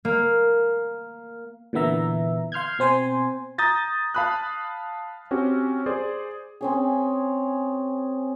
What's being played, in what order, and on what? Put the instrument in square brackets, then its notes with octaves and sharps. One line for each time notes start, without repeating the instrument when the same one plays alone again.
[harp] A#3
[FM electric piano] A#2 D3 E3 B3 E5 A#5
F5 C6 F6 G6 G#6
B2 C4 C5 G#5 C6
[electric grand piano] A#5 D#6 G6 A6 A#6
F5 A5 B5 D#6 F#6
C4 C#4 F#4 G4
G#4 C5 D5
[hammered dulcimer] C4 C#4 G#4